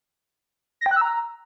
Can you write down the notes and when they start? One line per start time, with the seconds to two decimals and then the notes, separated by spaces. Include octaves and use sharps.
0.81 A#6
0.86 G5
0.91 F#6
0.96 E6
1.01 A#5